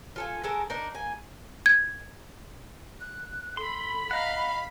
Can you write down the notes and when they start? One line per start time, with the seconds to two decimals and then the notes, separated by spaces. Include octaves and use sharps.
0.16 F4 A4 G#5
0.44 G#3 A4 A#4 A5
0.70 D4 D#4 A#4
0.94 A#3 G#5
1.66 G#6
3.00 F#6
3.57 A4 B5 C6
4.11 D#5 F5 F#5 A#5